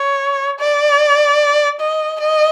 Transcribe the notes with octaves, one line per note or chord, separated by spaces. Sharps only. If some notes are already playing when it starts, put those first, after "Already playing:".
Already playing: C#5
D5
D#5
D#5